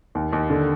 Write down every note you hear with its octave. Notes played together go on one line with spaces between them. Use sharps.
D#2
D#2
D3